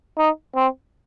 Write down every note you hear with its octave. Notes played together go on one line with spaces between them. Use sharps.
D#4
C4